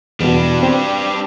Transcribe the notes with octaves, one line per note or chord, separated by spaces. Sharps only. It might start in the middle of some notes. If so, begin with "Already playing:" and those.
E2 B2 G3 D4
C4